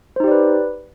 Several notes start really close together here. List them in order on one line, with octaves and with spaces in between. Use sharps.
C5 D#4 G4 D5 B4